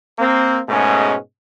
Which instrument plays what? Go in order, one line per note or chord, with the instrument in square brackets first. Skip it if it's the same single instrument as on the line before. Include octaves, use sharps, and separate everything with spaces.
[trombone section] A#3 C4
G#2 B2 G#3 A3 C#4